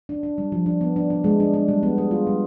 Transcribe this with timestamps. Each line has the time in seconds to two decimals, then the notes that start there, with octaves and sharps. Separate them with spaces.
0.09 D4
0.23 D4
0.38 G3
0.52 F3
0.66 D4
0.81 B3
0.96 D4
1.10 D4
1.24 G#3
1.40 D4
1.54 D4
1.68 G3
1.83 B3
1.98 G#4
2.11 F4
2.27 G3